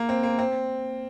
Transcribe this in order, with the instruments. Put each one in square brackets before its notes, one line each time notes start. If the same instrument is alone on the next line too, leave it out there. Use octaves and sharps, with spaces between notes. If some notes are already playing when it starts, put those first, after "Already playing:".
Already playing: [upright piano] A#3
C4
A#3
C4